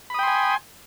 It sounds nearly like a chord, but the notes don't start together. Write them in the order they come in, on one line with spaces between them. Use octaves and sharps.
B5 D#6 G5 C6 G#5